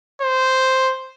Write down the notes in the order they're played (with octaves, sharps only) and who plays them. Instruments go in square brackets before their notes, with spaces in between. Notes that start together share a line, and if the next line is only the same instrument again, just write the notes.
[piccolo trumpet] C5